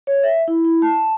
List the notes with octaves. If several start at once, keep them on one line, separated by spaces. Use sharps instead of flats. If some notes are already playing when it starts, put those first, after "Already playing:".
C#5
E5
E4
E4
A5